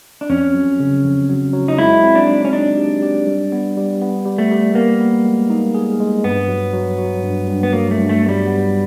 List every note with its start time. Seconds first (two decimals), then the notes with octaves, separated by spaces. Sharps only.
0.21 D4
0.30 F2 C#4
0.54 F#3
0.80 C#3
1.04 F2
1.29 F#3
1.53 F#3
1.68 D#4
1.78 G#3 E4
2.03 C4
2.15 D4
2.27 D#4
2.45 C#4
2.52 D4 D#4
2.78 G4
3.03 G4
3.27 G3
3.52 B3
3.77 G3
4.02 B3
4.25 G3
4.38 A3
4.51 G3
4.75 A#3 B3
5.00 B3
5.24 G#3
5.50 D#4
5.75 G#4
6.00 G#3
6.24 G2 B3
6.48 F#3
6.73 F#3
6.98 F#3
7.23 G2
7.48 G2
7.63 B3
7.73 F#3 A#3
7.91 A3
7.97 G2
8.09 A3
8.22 B3
8.29 G3
8.47 B3